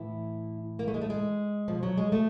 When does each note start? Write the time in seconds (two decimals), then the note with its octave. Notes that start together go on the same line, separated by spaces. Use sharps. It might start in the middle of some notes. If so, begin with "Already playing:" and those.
Already playing: A2 E3 E4
0.79 A#3
0.88 A3
0.94 G#3
1.01 A3
1.10 G#3
1.68 B2 F3
1.83 F#3
1.97 G#3
2.12 A3